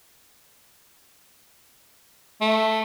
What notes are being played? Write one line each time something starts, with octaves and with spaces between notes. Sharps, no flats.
A3